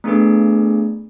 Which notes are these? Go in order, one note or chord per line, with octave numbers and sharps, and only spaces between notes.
A3 B3 D4 G#4 A4 B4